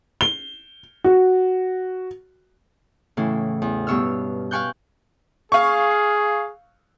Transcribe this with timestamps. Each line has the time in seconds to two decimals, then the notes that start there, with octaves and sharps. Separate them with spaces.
0.21 G7
1.04 F#4
3.17 A2 C#3 E3
3.62 E2
3.87 G2 B2 C#5 E6 F6
4.51 F5 G5 G#5 C#6 F#6 G6
5.52 G#4 F5 C#6